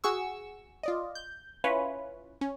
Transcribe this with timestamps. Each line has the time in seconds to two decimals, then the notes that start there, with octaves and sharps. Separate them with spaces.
0.04 F#4 G#4 C#6 E6
0.83 F4 D5 D#5
1.15 G6
1.64 C#4 E4 F4 B4 C#5
2.41 C#4